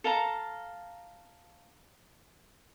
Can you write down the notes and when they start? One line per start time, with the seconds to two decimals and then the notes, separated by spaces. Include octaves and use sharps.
0.04 A4 F5 A5 A#5